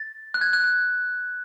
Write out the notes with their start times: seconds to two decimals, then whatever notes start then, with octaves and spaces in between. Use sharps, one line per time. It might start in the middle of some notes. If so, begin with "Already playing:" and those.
Already playing: A6
0.34 F#6
0.41 G#6
0.53 F#6
0.64 F#6